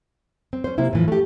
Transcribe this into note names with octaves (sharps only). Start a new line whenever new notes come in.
C4
C#4 C5
C3 A#3 C4 E4
A2 E3 F3
A3 G4